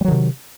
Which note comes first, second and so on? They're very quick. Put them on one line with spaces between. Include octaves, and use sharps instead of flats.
G3 F#3 D#3 C3